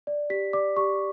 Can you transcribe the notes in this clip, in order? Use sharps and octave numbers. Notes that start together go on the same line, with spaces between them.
D5
G4 B6
D5 D6
G4 C#6